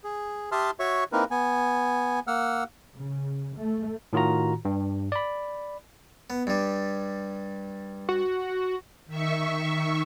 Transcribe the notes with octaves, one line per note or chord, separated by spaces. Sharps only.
G#4
G4 E5 A5 C6 D#6 F6
F#4 C#5 E5 C#6
A#3 C4 D#4 E4 A#4 B4
B3 G#5
A#3 F#5 E6 F6
C#3
A3
A2 D#3 F4 F#4 A#5
G2
D5 B5
B3
G2 G3
F#4
D#3 E5 C#6